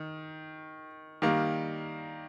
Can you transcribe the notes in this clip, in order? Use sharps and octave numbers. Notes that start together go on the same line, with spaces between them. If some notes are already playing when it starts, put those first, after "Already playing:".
Already playing: D#3
D#3 G3 A#3